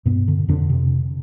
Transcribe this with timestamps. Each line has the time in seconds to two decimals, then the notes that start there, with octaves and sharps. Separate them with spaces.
0.06 G2 B2 B3
0.28 D3
0.48 F2 D3 D4
0.70 C3